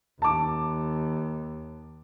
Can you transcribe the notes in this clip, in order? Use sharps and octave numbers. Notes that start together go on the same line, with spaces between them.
D#2 A5 D6